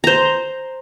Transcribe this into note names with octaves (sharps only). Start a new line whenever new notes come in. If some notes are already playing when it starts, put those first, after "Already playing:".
C5 A#5